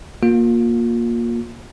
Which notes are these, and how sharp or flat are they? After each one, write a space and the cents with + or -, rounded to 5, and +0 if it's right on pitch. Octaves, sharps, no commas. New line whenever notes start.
A#3 +10 F4 +30